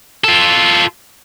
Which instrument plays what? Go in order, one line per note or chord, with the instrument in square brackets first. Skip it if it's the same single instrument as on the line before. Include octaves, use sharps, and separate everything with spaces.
[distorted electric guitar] F4 A4